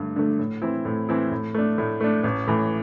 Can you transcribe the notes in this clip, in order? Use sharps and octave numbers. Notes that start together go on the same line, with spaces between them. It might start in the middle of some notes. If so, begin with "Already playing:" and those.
Already playing: G2 D3 A3
D3 A3
A2
E3 C4 E4
A2
E3 C4 E4
A2
A3 D4
A2
A3 D4
A1
A2 E3